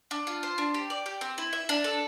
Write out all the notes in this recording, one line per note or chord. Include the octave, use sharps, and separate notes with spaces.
D4
F4
C5
D4
G4
D5
G4
C4
E4
E5
D4
A4